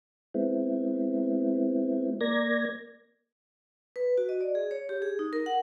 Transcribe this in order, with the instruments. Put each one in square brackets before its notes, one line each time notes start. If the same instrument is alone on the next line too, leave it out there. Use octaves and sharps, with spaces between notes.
[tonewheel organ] G#3 B3 C4 E4
A#3 A#4 D5 G#6 A#6
[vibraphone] B4
F#4
D#5
D5
G#4
C#5
G4
G#4
D#4
A#4
F#5